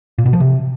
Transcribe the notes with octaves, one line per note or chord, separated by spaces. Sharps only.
A#2
B2
F3
C3